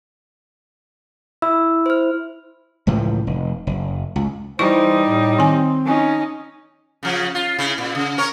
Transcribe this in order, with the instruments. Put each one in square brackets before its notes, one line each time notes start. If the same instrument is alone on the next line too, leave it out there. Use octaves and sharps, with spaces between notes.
[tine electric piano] E4 [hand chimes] E6
[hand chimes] C5 F6
[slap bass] C#2 A2 E3 F3
F1
F#1
C#2
[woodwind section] E3 C5 [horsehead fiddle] G3 D#4 [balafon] E4 C#6
[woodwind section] A2
[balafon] D#3 G#5 [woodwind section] C4
[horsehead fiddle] C#4 D#4
[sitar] C#3 F3
F4
C#3 E4
A#2
C#3
C#4 A#4 C#5